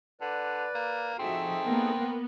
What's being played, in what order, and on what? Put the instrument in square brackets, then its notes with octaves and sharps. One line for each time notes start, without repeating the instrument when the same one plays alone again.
[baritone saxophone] D3 [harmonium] B4 D5
[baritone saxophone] A#3
[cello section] F3 F#4 E5 [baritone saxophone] C4 [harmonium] D#4 G#4 A4
[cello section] A#3 A#4 [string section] B3